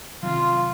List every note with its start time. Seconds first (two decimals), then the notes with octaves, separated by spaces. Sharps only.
0.23 C3 D#3 F#3 F4